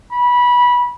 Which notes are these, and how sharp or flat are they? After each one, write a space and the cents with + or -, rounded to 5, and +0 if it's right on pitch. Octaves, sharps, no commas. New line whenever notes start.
B5 -20